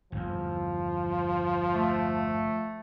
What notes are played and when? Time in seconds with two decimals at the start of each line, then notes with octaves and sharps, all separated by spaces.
0.12 G1 E2 F3
1.74 A3